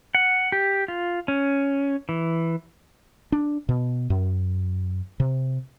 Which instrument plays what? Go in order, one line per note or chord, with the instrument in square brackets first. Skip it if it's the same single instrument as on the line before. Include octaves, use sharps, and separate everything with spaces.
[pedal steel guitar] F#5
G4
F4
C#4
E3
[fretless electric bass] D4
B2
F#2
C3